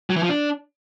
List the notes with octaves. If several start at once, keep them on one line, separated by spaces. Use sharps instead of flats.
F#3
E3
F3
D4